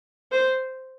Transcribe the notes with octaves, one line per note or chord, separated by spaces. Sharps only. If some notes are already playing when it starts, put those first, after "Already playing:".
C5